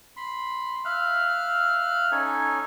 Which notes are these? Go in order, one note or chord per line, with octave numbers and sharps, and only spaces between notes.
B5 C6
E5 F5 F6 F#6
C#4 D#4 A4 C#5 G#5